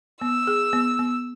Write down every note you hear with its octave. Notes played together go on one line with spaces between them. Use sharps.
B3 E6
G#4
B3
B3